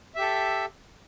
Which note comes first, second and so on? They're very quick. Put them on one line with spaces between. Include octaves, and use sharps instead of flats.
E5 G4 A4